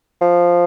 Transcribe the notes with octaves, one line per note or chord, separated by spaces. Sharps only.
F3